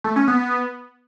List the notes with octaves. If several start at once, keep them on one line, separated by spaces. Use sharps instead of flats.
A3
C#4
B3